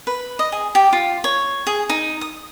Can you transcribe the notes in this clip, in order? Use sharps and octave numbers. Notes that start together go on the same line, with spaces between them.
B4
D#5
G#4
G4
F4
C#5
G#4
D#4
D#6